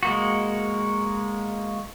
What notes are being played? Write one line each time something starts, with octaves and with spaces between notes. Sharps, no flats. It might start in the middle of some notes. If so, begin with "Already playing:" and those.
G#3 A#3 F#4